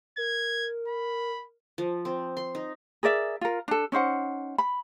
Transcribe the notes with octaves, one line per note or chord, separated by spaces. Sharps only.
A#4 G#6
B5
F3
C4
C6
D#4
G#4 A#4 D5 E5
F4 A#4
D4 A4
C#4 D#4 C5 F#5
B5